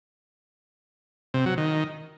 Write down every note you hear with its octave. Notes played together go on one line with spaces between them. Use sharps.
C3
F#3
D#3